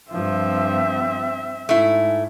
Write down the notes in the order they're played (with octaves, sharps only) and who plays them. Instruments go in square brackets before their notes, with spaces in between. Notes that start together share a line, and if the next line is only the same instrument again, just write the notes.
[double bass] G2 F3 [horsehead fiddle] C4 E5
[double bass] G#2 [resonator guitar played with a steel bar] A3 E4